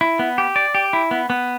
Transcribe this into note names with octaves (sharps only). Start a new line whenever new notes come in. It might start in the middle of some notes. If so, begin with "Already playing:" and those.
E4
B3
G4
D5
G4
E4
B3
B3